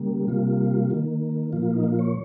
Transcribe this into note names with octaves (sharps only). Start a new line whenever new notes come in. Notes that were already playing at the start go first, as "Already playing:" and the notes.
Already playing: C#3 G3 A#3
C3 G3 A#3 F4
D#3 A#3
A#2 F3 A#3 F4
F4
D#4
F4
C#5